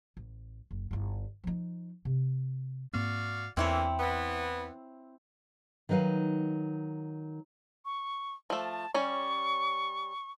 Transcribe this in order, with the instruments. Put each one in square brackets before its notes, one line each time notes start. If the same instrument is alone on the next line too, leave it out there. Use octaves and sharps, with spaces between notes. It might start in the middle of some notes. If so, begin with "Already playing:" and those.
[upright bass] A1
F#1
G1 E4
F3 D#4
C3
[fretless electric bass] G#2 A#3 C4 [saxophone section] F#4 D5 F5
[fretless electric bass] E2 [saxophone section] D3 E3 A#3 [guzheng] C4 E4 C#5
[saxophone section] E3 B3
[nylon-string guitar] D#3 F#3 D#4 B4 F5
[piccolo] C#6
[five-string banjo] F3 A3 [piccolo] A5
[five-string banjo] G3 C#4 C#5 [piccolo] C#6